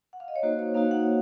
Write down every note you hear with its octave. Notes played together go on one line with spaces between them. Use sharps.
F#5
F5
D#5
C#5
A#3 D#4 F#4 C5
C#5
A#3 D#4 F#4 F5
F#5